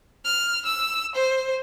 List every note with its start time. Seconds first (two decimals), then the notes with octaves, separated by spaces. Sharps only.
0.24 F6
0.66 E6
1.16 C5